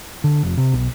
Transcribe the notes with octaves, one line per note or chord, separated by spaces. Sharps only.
D3
F1
C3
B1